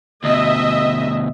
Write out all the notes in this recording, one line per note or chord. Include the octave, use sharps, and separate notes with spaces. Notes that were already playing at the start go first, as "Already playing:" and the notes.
D2 B2 D#5 E5